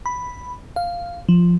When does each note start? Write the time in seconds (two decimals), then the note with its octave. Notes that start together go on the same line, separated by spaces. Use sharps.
0.06 B5
0.76 F5
1.29 F3